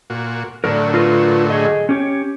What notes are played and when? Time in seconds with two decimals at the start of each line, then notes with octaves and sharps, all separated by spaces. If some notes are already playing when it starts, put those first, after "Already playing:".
0.10 A#2 F#4
0.64 A2 D3 F#3 D4 A#4
0.94 F4 A#4 B4
1.50 G#4 D#5
1.89 C#4 G4 C#5